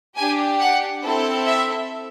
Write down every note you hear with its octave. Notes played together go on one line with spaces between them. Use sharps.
D4 G4 G#5
F#5
C4 E4 A4
E5